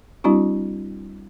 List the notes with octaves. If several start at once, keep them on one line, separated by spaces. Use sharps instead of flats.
G3 C4 D4 E4 F#4